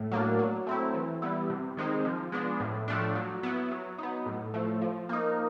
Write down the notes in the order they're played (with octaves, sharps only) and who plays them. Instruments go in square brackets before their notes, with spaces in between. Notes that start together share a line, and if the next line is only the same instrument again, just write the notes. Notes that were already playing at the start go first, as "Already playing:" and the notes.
Already playing: [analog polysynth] A2
F#3 A#3 D4
F#3
A3 C4 E4
E3
G3 B3 E4
C3
D#3 G#3 C4 D#4
F3
G#3 B3 D4
A2
F3 A3 D4
F#3
B3 E4
F#3
B3 D#4
A2
F3 A3
F3
A#3 D#4